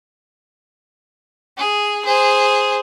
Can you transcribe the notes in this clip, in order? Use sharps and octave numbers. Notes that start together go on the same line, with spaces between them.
G#4
G#4 C5